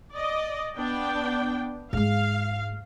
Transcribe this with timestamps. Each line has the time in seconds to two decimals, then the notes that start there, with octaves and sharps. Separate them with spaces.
0.13 D5 D#5
0.78 B3 D4 G5
1.93 G#2 G#3 F5